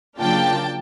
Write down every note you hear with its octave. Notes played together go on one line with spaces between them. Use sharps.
C#3 F#3 A#3 D4 F4 G5 A5